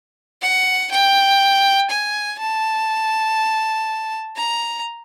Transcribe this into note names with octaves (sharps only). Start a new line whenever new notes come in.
F#5
G5
G#5
A5
A#5